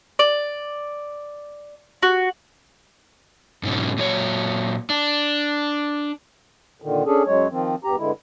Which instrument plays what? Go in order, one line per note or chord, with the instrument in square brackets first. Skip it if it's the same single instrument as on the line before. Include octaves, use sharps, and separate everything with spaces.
[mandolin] D5
F#4
[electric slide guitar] G#2 B2 F#3 C#4
A#2 F#3 C#5
D4
[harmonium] A#2 D3 D#3
C#4 D4 G#4 A4
F#2 F#3 G#3 C#5
D#3 F3 C4
E2 G2 G4 A#5
G2 D3 G#3 E4